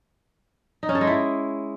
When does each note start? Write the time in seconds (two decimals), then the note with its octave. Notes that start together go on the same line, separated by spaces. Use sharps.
0.83 D#4
0.89 C#4
0.95 A4
1.01 G#3
1.07 E4